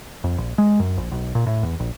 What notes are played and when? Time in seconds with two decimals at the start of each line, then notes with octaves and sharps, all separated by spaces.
0.24 F2
0.38 A#1
0.58 G#3
0.80 F#2
0.97 A#1
1.12 B1
1.35 A#2
1.47 A2
1.63 E2
1.80 A#1